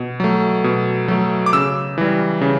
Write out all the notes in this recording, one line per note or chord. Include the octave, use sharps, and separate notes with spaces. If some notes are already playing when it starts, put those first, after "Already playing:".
Already playing: B2
F#3 A3
B2
F#3 A3
D6
C#3 E6
E3 G3
C#3